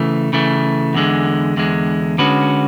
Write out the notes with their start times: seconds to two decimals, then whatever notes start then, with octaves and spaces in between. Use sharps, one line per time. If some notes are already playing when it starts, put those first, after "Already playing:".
Already playing: C#3 E3 A3
0.33 C#3 E3 A3
0.94 E2 D3 G#3
1.57 E2 D3 G#3
2.18 D3 G#3 C#4 F#4 B4